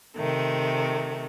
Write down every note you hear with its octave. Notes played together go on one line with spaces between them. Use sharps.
C3 D#3 A3